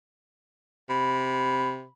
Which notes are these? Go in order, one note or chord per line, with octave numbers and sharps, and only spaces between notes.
C3 B5